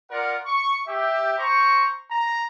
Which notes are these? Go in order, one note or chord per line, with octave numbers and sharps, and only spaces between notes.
F4 A#4 D5 F#5
C#6
G4 E5
C5 A#5 C#6
A#5